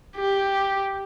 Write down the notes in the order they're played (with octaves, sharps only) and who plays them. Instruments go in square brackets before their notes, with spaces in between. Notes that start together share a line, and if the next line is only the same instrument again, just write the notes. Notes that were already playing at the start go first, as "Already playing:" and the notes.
[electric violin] G4